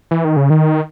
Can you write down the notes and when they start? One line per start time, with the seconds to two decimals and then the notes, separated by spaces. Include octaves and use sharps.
0.11 E3
0.25 D#3
0.37 C#3
0.50 D#3